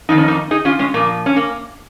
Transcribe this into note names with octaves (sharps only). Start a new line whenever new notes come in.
F2 D#3 D#4
C#4
A#3 D#4
D#4 G#4
C#4 F4
G#3 C#4
A#2 F3 A#3
C#4
A#3